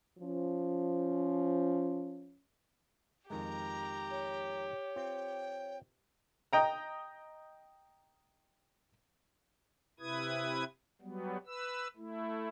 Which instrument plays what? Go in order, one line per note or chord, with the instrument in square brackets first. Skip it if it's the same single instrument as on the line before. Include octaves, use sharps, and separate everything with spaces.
[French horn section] F3 C#4
[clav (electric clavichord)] F2 D#3 G#3 [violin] G4 [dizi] A#5
[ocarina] C#5
[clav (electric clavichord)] C4 F4 [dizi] G5
[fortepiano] D#5 G5 A#5
[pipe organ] C3 E4 B4 D#6 G#6
F#3 G3 B3
B4 E6
A3 E4